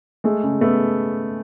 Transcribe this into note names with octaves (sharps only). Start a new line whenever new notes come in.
G#3 A3
C#3
A3 B3